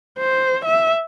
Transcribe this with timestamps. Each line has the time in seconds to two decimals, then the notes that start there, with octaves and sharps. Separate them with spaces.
0.18 C5
0.65 E5